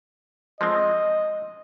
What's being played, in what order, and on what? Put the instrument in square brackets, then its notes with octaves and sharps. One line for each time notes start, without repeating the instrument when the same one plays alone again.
[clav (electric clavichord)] F3 G#3 C4 [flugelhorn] D#5